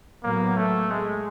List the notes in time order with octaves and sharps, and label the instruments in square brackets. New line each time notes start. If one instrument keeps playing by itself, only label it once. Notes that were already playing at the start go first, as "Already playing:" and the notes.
[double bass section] A2 F#3 B3 [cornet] A#3
[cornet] A3
G#3